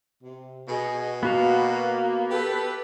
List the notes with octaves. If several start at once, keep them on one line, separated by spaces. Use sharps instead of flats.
C3
B2 G#4 D#5
A#3 B3 F#4 F5
G4 A4 B4